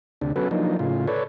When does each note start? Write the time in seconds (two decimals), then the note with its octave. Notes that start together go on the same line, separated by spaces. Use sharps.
0.21 D2 C3 D4
0.36 F#3 B3 C#4 F#4 A4 B4
0.51 F3 F#3 A#3 D4 D#4
0.79 A2 C#3 F4
1.08 A4 B4 C#5 D5